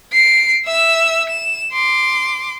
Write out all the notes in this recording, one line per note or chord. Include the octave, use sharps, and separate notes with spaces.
C7 D7
E5 E6
E7
C6 D6